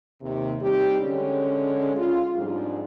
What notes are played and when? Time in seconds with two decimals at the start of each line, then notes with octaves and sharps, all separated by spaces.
0.21 D#2 C3
0.61 G3 C4 D#4 G4
1.00 D3 G#3 C#4
1.95 F4
2.35 F2 G#2 G3 D4 G#4